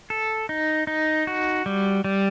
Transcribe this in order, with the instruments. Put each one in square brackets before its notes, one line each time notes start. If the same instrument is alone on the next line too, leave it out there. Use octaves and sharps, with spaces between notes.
[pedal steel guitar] A4
D#4
D#4
F#4
G3
G3